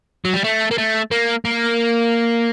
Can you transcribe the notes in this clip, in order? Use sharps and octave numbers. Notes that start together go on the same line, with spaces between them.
F#3
G3
A3
A#3
A3
A#3
A#3